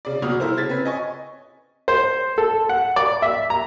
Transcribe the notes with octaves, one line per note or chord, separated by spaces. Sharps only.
C#3 D5
C2 B2 D#6 F6
E4 A4 A#4 C5
C#3 G#6 A6 B6
C4 C#4 B4
D#5 G#5 C#6
C5
A4
F#5
D5
E5
A#5